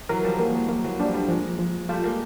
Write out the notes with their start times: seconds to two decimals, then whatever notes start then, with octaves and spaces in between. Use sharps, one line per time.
0.09 E3 F#3 A#4
0.24 F3 G3
0.39 F#3 G#3 A#3
0.54 E3 F#3
0.69 E3 F#3 A#3
0.84 E3 F#3
0.99 F3 G3 D4
1.14 G3 A3
1.28 F3 G#3 A#3
1.59 F3
1.89 G3 A3 F4
2.04 G#3 A#3